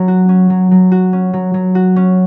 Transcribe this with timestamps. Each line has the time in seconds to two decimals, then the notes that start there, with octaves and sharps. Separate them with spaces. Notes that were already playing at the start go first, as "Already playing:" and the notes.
Already playing: F#3 C#4
0.08 F#4
0.29 C#4
0.50 F#3
0.71 F#3
0.92 F#4
1.13 C#4
1.33 F#3
1.54 F#3
1.75 F#4
1.96 C#4